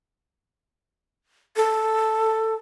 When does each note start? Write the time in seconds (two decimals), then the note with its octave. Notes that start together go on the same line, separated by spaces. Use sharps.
1.56 A4